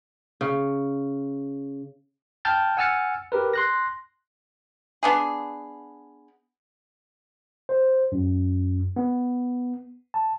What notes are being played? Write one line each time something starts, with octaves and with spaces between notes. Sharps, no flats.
C#3
G5 A5 F6 G6 A6
F#5 G#5 E6 F6 A6 C#7
G4 A#4 B4
C6 F#6 A#6
B3 D4 G#4
C5
F#2
B3
A5